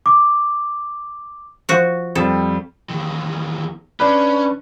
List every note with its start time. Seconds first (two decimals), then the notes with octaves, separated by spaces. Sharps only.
0.06 D6
1.69 F3 F#4
2.15 F2 G3 A4
2.89 E2 D#3
4.00 C#4 D4 B4